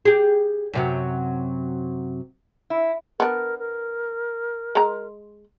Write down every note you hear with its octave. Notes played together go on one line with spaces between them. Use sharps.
G4 G#4
F#2 C3 F#3
E4
B3 D4 A#4
A#4
G#3 A#5